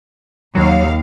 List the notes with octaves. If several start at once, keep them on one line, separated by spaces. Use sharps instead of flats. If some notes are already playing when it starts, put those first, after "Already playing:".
D#2 F#3 F5